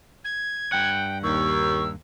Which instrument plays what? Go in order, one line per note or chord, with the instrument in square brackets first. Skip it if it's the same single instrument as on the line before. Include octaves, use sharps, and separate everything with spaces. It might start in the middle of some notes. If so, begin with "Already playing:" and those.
[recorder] G#6
[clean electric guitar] G2 F#5 [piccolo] G5
[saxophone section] D#2 [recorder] C#6 [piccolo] E6